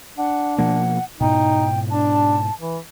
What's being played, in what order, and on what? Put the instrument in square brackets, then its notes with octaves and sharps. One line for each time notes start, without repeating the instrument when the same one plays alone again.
[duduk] D4 [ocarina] F#5
[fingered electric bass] B2 F3 A#3 [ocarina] F#5
[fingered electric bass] G#2 B2 [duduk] D#4 [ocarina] G5
[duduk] D4 [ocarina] A5
[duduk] E3